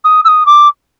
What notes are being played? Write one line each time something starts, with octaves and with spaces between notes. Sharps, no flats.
D#6
E6
D#6
D6